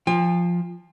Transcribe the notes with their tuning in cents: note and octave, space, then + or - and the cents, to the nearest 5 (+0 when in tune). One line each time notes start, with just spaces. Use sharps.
F3 +0 G5 +45